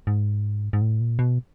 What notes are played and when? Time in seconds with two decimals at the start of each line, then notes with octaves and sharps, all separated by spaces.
0.07 G#2
0.73 G#2
0.81 A2
1.01 A#2
1.19 B2